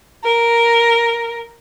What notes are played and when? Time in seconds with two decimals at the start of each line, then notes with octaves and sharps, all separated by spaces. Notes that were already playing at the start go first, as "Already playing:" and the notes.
0.24 A#4